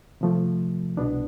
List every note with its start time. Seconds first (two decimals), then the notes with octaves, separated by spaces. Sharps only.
0.21 C3 F3 A3
0.97 C2 B2 B3 D4